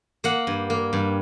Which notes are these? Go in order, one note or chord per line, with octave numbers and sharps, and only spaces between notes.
A#3 F#5
G2
A#3
G2